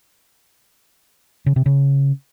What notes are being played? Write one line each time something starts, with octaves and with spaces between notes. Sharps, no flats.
C#3
C3
C#3